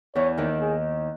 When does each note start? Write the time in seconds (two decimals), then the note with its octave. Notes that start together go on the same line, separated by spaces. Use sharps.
0.15 E2 E3 C#5
0.37 D#2 D#3
0.61 G#4